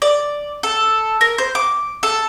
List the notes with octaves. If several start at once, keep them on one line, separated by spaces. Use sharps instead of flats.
D5
A4
A#4
C5
D6
A4